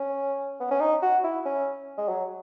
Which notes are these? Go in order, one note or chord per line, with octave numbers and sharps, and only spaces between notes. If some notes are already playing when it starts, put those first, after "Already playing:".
Already playing: C#4
B3
C#4
D#4
F#4
E4
C#4
G#3
F#3